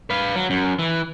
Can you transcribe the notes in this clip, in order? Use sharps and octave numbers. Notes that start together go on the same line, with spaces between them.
B4 F5
F#3
F#2
E3